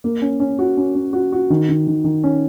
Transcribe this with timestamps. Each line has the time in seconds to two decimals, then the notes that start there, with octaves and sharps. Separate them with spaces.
0.04 A#3
0.22 C#4
0.40 C#4
0.59 F#4
0.77 C#4
0.95 C#4
1.13 F#4
1.32 F#4
1.50 D#3
1.69 D#3
1.87 D#3
2.04 D#3
2.24 C#4